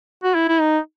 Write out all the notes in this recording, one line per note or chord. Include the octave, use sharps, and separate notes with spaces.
F#4
E4
E4
D#4